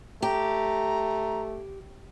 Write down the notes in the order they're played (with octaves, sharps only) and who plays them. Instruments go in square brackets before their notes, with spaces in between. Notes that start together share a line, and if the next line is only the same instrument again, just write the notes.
[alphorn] A3 [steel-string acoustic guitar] G4 [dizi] A#5